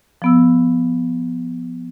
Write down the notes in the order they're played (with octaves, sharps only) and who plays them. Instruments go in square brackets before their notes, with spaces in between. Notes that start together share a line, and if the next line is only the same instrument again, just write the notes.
[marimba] F3 B3 E6